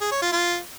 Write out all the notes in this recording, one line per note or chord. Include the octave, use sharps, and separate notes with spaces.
G#4
C#5
F4
F4